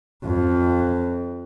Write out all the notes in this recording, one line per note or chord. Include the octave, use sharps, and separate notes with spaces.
F2